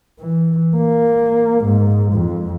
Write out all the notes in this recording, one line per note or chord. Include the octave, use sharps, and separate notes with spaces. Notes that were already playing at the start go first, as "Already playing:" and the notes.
E3
A#3
G#2
F2